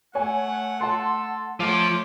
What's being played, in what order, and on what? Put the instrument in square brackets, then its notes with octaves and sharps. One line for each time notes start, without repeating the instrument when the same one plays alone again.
[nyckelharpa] A3 [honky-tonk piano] C#5 G#5 [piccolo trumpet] F#5
[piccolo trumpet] A4 [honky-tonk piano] F#5 A5 C6
[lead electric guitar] F3 [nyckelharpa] A3 C#5 [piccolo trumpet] D6